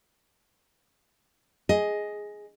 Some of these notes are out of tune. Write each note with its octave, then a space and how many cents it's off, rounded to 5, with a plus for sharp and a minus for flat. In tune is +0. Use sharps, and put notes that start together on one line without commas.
G#4 +0 D#5 +10